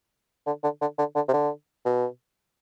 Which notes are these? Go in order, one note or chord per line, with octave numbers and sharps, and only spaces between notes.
D3
D3
D3
D3
D3
C3
D3
B2